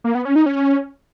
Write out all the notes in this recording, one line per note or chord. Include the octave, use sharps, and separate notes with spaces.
A#3
B3
C#4
D#4
C#4